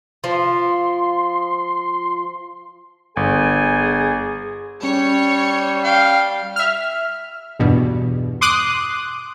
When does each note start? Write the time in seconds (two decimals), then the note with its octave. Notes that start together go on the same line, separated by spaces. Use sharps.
0.24 F3 C6
3.17 G1 G#4 G#5
4.83 G3 C#4 C#5
5.84 F5 G5
6.56 E5 F6
7.59 E2 G2 B2
8.41 C6 D6 D#6 F#6